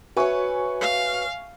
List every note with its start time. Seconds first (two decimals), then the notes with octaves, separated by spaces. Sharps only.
0.17 F#4 B4 C#5 E5 G#5 C#6
0.81 F5